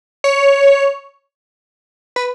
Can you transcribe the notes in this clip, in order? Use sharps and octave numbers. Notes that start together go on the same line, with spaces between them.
C#5
B4